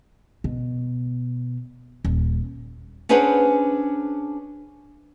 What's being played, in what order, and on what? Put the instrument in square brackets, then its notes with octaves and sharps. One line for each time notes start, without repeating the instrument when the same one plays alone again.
[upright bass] B2
D#1
[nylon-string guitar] C#4 D4 G#4 B4 C5 F#5